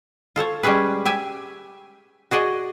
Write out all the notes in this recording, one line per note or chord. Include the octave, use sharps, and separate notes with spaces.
F4 A4 C5 C#5
G3 G#3 C#4 G#4 B4
G4 E5 G#5
F#4 G#4 D5 D#5